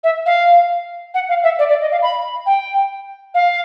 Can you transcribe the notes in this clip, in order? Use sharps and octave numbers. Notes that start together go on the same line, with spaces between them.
E5
F5
F#5
F5
E5
D5
D5
D#5
F5
B5
G5
F5